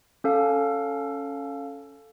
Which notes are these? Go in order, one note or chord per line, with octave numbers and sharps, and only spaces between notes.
C#4 A4 F5